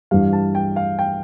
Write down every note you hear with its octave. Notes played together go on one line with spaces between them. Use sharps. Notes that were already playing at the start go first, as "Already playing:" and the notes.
G2 E3 G3 F5
A5
G5
F5
G5